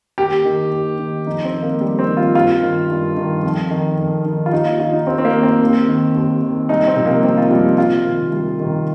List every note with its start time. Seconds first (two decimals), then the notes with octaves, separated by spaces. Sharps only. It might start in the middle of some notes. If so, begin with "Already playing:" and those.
0.18 D#2 G4
0.45 D#3
0.73 D#2
0.99 D#3
1.27 F2 D#4
1.45 C4
1.54 D#3
1.63 A#3
1.81 F2 G3
1.99 C4
2.08 D#3
2.17 F4
2.35 G2 F4
2.63 D#3
2.90 G2
3.16 D#3
3.44 F2
3.71 D#3
3.98 F2
4.25 D#3
4.46 F4
4.53 D#2 D#4
4.66 F4
4.80 D#3 F4
4.93 D#4
5.06 D#2 C4
5.18 C4
5.25 A#3
5.34 D#3
5.43 C4
5.61 D#2
5.88 D#3
6.15 D#2
6.43 D#3
6.69 C2 D#4
6.88 C4
6.96 C3 F3
7.06 A#3
7.23 C2 C4
7.38 F4
7.51 C3 F3 G3
7.78 C2 F4
8.06 C3 D#3
8.32 C2
8.60 C3 D#3